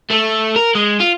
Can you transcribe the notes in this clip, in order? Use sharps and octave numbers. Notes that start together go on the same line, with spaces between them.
A3
A#4
G#3
F4